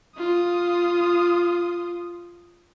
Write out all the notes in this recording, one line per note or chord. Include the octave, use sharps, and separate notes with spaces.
F4 D#6